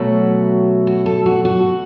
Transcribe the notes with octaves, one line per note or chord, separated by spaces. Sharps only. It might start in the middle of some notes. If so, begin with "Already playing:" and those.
Already playing: B2 F#3 A3 F#4
F#4
A4
F#4
F#4